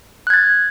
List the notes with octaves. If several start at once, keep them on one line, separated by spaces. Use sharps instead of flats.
F#6 G#6 A6